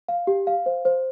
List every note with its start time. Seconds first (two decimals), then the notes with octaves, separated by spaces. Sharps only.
0.08 F5
0.27 G4
0.47 F5
0.66 C5
0.85 C5